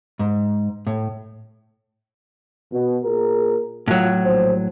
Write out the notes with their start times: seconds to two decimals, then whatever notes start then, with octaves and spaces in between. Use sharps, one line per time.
0.19 G#2
0.87 A2
2.72 B2
3.04 A#2 G#4 A#4
3.88 A2 F#3 F4
4.24 A#1 C5